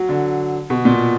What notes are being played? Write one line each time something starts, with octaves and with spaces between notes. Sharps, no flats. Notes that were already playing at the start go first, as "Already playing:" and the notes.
Already playing: F#3
D3
B2
A#2